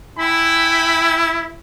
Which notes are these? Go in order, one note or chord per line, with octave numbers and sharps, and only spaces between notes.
E4 G5 G#5 B5